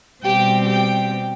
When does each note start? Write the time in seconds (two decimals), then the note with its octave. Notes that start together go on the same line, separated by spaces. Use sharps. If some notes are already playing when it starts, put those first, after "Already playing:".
0.23 B2 G3 C4 G4 G5
0.67 G4 G5